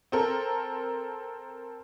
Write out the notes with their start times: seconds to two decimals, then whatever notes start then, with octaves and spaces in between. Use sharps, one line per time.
0.12 C4 A4 A#4